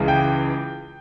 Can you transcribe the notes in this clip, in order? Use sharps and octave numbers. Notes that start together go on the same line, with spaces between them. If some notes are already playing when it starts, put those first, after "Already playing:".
Already playing: C#2 C#3 E3
G5